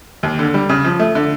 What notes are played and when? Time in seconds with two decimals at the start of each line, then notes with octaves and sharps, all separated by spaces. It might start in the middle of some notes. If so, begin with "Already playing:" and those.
0.23 D#2
0.39 D3
0.54 G3
0.69 C#3
0.84 F3
0.99 A3
1.15 D3